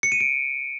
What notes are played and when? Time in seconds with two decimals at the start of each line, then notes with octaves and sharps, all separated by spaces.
0.03 C#7
0.12 D#7
0.20 D7